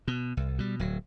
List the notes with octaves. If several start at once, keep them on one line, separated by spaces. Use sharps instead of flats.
B2
C2
B2 G3
D1 F#3